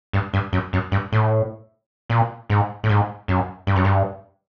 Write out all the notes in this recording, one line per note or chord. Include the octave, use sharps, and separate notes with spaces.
G2
G2
F#2
F#2
G2
A2
A#2
G#2
A2
G#2
F#2
G2
F#2
G2